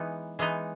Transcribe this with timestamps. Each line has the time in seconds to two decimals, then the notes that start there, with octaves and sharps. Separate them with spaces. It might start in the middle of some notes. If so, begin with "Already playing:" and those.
Already playing: E3 G#3 B3 D#4
0.39 E3 G#3 B3 D#4